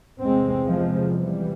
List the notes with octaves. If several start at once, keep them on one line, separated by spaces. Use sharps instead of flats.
E2 C3 G#3 C4
F3 G#3
E3 G3